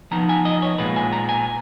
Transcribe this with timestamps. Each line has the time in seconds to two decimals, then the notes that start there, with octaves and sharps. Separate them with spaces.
0.11 F3 B3 D#4 A#5
0.29 G#5
0.45 D#5
0.62 C#5
0.78 A#2 G#3 B3 F4 B4
0.96 G#5
1.13 A#5
1.29 G#5